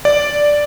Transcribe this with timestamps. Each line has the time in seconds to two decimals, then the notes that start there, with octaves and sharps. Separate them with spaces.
0.05 D5